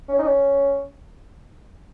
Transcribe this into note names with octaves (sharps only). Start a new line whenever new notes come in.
C#4
D#4
C#4